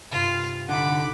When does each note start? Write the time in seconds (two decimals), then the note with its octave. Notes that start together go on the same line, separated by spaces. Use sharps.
0.11 G2 C3 F4
0.69 A1 D3 D#4 E5 F#5 B5 D6